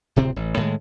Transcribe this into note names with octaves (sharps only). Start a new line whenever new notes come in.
D1 C3 C4
A1
A2 D#3 G#3